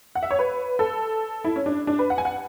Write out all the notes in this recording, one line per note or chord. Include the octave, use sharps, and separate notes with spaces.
F#5
E5
C#5
B4
A4
E4
C#4
D4
D4
B4
F#5
G#5
F#5